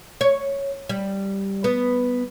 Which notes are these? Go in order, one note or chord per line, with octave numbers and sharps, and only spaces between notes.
C#5
G3
B3